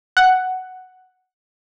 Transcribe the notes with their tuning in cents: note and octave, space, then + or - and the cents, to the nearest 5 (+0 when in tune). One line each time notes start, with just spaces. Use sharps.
F#5 +5